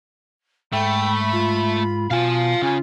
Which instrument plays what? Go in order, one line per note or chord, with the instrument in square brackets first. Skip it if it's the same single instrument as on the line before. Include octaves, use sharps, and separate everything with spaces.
[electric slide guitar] G#2 [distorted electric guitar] A3 [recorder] G5 [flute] B5
[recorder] F4
[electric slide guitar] B2 G#5 [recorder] F4 [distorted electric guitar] F5 A5
[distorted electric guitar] C#3 [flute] G#5